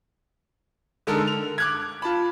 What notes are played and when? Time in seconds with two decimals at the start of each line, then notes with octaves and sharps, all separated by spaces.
1.07 D3 G#3 D#4 A4 A#4
1.27 F7
1.58 D6 F#6 G#6
2.02 F4 A5 B5